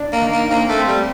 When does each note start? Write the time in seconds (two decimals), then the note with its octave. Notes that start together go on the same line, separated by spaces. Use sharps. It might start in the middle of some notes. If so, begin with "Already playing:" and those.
Already playing: D4
0.12 A#3
0.22 D#3
0.31 A#3
0.50 A#3 C4
0.69 A3
0.78 C4
0.87 G3